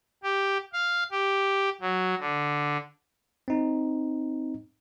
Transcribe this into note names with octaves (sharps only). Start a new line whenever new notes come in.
G4
F5
G4
F#3
D3
C4 D#4